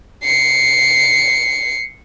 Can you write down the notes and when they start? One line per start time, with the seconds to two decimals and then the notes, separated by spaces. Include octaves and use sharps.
0.24 C7 C#7